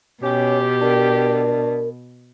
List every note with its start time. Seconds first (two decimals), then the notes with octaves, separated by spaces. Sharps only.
0.23 B2 C#4 G4 C#5
0.81 D4 A#4